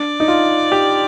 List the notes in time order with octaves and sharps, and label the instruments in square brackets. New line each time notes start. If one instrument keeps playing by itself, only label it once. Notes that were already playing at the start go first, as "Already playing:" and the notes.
Already playing: [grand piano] D4 [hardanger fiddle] D5
[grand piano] D#4
F4
G4